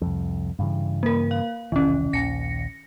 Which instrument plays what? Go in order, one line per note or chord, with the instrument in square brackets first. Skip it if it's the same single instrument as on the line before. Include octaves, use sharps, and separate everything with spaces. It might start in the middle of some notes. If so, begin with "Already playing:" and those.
[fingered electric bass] C2 F2
G2 C#3 E3
[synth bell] A#3 A#4
F5
[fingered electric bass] E1 C2 [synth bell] D#3 C#4
[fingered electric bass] A#1 D#2 [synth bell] A#6 C#7